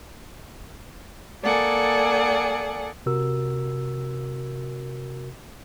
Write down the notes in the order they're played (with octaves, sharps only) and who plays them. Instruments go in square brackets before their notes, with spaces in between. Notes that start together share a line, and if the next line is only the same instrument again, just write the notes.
[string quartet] A#3 G#4 A4 D5 F#5 G#5
[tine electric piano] C3 F#4 A#4 E6